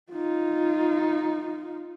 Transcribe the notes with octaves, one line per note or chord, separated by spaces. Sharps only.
D#4 F4